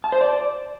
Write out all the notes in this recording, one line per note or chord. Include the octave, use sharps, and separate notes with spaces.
A5
C5
D5